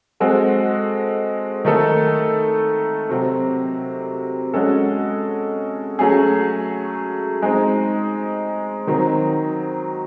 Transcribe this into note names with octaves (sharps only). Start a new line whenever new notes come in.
G#3 C4 F#4 A4
D#3 A3 D#4 A4
C3 F#3 C4
G#3 C#4 F#4 A4
F#3 A3 C#4 G#4
G#3 C4 D#4
D#3 F#3 C4 D#4